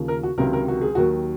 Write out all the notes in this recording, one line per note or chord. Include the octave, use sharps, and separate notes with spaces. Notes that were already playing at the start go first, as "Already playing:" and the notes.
Already playing: D#2 C#3 F3
A#4
F#4
C#2 C3 D#3 F#3 A#4
A#4
F#4
G#4
D#2 D#3 F#3 F#4